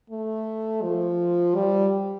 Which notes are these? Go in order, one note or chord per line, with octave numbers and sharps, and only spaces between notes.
A3
F3
G3